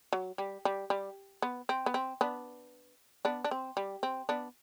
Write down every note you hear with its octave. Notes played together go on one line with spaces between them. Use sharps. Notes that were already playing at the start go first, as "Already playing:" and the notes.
F#3
G3
G3
G3
B3
C4
B3
C4
B3 D4
B3 D4
D4
C4
G3
C4
B3 D4